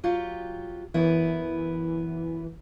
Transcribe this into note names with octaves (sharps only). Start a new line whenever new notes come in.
F#3 F4 G4
F#2 E3 B3 E4